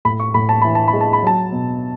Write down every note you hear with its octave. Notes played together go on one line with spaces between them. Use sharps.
A2 B5
C#6
A2 B5
A5
E3 B5
A5
B5
G#3
A5
B5
F#3 A5
B2